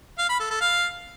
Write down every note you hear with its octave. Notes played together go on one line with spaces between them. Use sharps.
F5
B5
A4
A4
F5